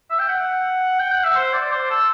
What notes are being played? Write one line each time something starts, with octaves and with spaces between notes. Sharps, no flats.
E5
G5
F#5
G5
F#5
E5
C5
D5
C5
A4